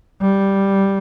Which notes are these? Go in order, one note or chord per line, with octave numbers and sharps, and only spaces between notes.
G3